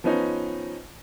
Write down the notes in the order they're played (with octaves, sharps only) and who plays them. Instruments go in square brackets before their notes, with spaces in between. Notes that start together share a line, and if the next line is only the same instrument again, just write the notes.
[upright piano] F3 B3 C#4 D#4